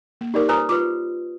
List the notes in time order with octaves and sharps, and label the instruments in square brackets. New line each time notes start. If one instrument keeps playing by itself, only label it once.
[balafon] A#3
[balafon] D#4 A#4 [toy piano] G4 D5 D6
[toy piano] B4 C5 D#6 [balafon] G#5 A#5
[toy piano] F4 B4 [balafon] D6